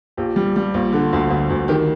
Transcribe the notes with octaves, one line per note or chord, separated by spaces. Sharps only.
A#1 G4
G3
G3
A#1
D3
D2
D2
D2
D#3 G4